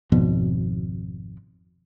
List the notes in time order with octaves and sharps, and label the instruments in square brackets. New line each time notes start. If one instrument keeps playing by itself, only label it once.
[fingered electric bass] G#1 F2 B2